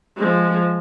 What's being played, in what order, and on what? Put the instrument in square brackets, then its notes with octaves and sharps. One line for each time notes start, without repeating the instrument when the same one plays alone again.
[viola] F3 G#3